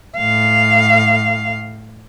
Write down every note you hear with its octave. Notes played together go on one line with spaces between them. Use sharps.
A2 F5